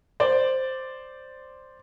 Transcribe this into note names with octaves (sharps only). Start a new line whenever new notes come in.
C5 D5